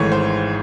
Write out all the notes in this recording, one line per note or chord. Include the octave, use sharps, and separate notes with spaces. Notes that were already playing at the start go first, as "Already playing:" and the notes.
Already playing: G#1 G#2 E3 A3 C#5
C5